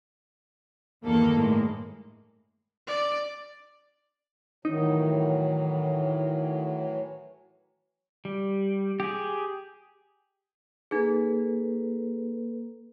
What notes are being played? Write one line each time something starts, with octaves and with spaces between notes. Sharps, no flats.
E2 G2 D#3 A#3 A4
A2 G#3
D5
A2 D#3 E3 F#3 D#4
G3
G4 G#4
A#3 D#4 G#4 A4 B4